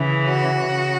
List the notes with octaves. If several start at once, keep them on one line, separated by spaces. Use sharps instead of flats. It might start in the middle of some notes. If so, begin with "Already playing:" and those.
Already playing: C#3 E3
F#4
C#3